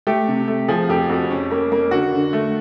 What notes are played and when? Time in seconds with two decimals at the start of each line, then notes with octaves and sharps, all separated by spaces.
0.07 A3 G4
0.28 C3
0.48 A3
0.68 F3 G#4
0.89 F2 G4
1.09 F2 F#4
1.30 C#4
1.51 A#3
1.72 A#3
1.91 D3 F#4
2.13 D3
2.33 A3